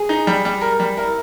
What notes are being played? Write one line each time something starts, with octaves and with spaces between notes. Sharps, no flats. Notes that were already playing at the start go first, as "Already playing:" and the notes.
Already playing: G#4
D#4
G3
G3
A#4
G3
E4 A#4